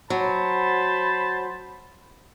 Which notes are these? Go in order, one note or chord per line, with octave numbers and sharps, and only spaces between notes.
F#3 C5 A5 B5